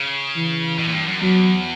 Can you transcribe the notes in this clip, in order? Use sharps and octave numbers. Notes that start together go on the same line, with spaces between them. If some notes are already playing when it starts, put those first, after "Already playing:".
Already playing: C#3
E3
B2
A#2
G2
F#2
E2 F#3